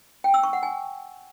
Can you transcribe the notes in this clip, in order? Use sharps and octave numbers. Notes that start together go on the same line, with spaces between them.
G5
E6
C#6
F#5
G#5